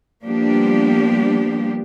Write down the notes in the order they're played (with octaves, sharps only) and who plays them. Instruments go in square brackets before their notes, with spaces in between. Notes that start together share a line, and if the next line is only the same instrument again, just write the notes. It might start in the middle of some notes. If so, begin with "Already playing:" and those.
[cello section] F3 G3 A#3 B3 D4 G4